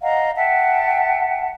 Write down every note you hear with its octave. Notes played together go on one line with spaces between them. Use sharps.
D#5 F5 F#5 A#5
E5 F#5 G5 A5